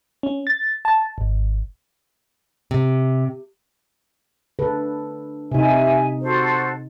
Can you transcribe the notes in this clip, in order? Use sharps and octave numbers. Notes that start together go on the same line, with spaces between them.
C#4
A6
A5
G#1
C3
D3 A4 B4
C3 D#4 E5 G#5
F#4 A4 C5